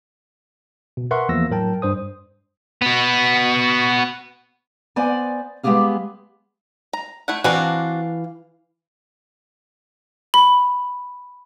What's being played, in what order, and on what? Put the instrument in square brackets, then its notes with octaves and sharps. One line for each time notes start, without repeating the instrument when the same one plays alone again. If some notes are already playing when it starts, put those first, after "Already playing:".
[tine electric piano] B2
A#4 B4 E5 F#5 C6 C#6
E2 F3 A#3 E6 A#6
A2 F#3 A#4 G5 A5
G2 C5 D#6
[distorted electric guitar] B3 F#4
[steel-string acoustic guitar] B3 C5 D5 G#5
G3 G#3 B3 G4 G#4 F5
[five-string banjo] A#5
A3 E4 F#5
[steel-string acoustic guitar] E3 F5 [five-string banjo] C4 D4 F#4
[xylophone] B5